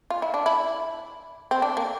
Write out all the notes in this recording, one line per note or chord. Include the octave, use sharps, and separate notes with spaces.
F4
E4
D4
E4
C4
D4
A#3